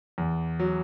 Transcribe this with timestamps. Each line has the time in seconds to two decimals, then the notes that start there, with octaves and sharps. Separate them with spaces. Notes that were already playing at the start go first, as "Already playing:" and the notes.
0.18 E2
0.59 F#3